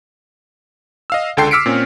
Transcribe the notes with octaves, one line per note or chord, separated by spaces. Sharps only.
D#5 F5 E6
C#2 D3 A4 G5 C6 C7
D6 E6 F6 B6 C#7 D7
A#2 C4 C#4